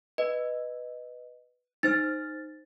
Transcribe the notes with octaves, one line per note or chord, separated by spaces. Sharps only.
B4 D#5
D#4 C5 F6 A6